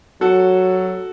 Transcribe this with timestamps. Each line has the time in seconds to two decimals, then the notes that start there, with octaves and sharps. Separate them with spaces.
0.21 F#3 F#4 A4